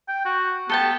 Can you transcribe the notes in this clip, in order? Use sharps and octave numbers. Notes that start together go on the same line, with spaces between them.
G5
F#4
B3 A4 G5 A5